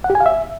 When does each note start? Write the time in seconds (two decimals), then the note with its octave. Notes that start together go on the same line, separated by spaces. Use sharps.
0.04 F#5
0.10 G4
0.15 G#5
0.20 F5
0.26 E5